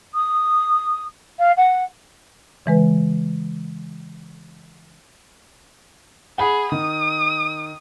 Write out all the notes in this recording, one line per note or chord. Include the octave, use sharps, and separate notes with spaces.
D#6
F5
F#5
C#3 E3 G#3 B4
G#4 F#5 B5
D#3 D#6